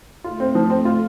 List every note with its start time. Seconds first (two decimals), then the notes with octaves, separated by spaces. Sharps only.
0.24 A3 F4
0.40 C4
0.55 F3
0.70 A3 C4
0.85 F4